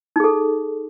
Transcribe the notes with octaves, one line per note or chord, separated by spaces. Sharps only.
D#4 G#4 A4